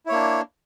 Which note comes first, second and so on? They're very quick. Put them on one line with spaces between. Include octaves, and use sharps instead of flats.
E4 C#5 A#3 D4